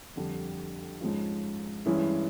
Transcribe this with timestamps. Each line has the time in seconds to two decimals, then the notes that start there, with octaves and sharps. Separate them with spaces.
0.16 F2 D3 G3
1.01 G#2 F3 G#3 C#4 F4
1.85 G2 E3 G#3 C#4 E4